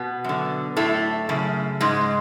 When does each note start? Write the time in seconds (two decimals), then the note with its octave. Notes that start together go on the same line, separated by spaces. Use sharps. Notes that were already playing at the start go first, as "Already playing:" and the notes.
Already playing: B2 B3
0.24 F#2 D3
0.77 A2 A3
1.29 F#2 C#3
1.81 G#2 G#3